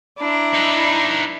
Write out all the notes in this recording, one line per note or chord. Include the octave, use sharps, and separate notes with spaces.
D4 E4 A#5
D#4 B4